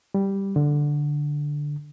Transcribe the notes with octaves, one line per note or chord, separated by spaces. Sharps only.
G3
D3